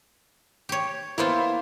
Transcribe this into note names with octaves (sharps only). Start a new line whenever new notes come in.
G4 C#5
A#3 B3 E4 F4 C5